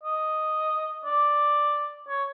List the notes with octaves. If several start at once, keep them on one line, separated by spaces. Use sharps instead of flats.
D#5
D5
C#5